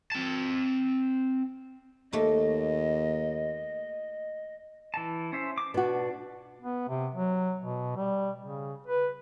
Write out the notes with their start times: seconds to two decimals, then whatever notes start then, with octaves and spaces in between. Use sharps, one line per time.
0.12 C4 A5
2.13 D#2 A3 A#3 D#5
4.94 E3 A5
5.32 C#4 C5 E5
5.58 D6
5.74 B2 D4 F#4
6.62 B3
6.89 C3
7.15 F#3
7.62 B2
7.97 G3
8.42 C#3
8.87 B4